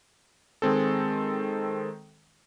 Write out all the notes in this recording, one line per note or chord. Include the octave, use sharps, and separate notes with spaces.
D#3 G#3 C4 A4